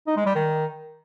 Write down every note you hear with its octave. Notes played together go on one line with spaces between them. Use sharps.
D#4
G#3
G3
D#3